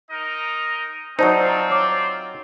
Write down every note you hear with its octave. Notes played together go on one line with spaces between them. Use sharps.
D#4 A#4 D#5
F#3 C4 D#4 F4 C5 D5 A5
C#5 D6